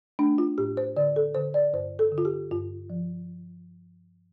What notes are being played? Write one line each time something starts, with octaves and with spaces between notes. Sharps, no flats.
A3 D4
F4
A2 G4
C5
D3 D5
A4
D3 C5
D5
G2 C5
A4
D3
F4
G4
G2 F4
F3